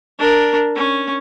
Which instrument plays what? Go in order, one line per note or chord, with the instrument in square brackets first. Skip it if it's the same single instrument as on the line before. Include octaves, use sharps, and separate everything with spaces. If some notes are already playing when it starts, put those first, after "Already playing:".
[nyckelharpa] D4 A#4
C#4